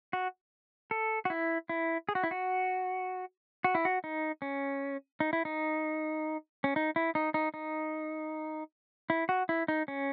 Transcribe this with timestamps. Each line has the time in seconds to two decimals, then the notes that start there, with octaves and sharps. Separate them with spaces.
0.13 F#4
0.91 A4
1.25 F#4
1.30 E4
1.69 E4
2.09 G#4
2.15 F#4
2.24 E4
2.31 F#4
3.64 F#4
3.75 E4
3.85 F#4
4.04 D#4
4.42 C#4
5.20 D#4
5.33 E4
5.45 D#4
6.64 C#4
6.76 D#4
6.96 E4
7.15 D#4
7.34 D#4
7.54 D#4
9.10 E4
9.29 F#4
9.49 E4
9.68 D#4
9.88 C#4